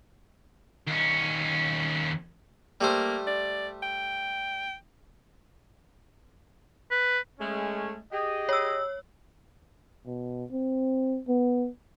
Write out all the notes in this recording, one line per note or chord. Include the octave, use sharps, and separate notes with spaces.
D#2 C#4
G3 A3 A#3 C5
D5
G5
B4
G#3 A3 C#4
G4 G#4 D#5
C#5 E6
B2
C4
B3